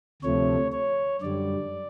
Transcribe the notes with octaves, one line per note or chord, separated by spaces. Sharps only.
D2 C3 F3 A3 C#5
C#5
F#2 D3 G3 D5